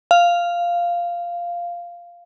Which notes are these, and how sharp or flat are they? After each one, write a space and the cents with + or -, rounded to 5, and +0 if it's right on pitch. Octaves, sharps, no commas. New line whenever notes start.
F5 -5